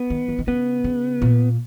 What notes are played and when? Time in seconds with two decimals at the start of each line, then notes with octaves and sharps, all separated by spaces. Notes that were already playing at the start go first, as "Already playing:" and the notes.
Already playing: B3
0.10 D#3
0.28 D#3
0.39 D#3
0.47 C#3 B3
0.84 C#3
1.22 A#2